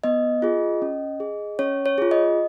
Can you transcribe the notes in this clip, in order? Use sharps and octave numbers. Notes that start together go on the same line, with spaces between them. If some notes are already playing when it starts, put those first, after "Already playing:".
B3 D#5
F4 G#4
C#4
G#4
C#4 C#5
C#5
F4 G#4
D#5